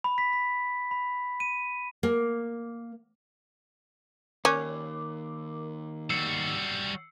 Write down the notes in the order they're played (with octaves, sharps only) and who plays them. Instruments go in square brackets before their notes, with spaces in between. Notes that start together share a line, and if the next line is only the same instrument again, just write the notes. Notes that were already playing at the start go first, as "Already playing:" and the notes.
[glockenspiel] B5
B6
B6
B5
D#7
[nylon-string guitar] A#3
[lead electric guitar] D#2 [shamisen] C#4 [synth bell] A#4 D6
[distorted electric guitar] G3 F#4 [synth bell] E6 C7 C#7